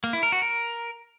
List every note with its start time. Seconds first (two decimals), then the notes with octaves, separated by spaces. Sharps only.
0.04 A#3
0.13 E4
0.23 A#4
0.32 F#4
0.42 A#4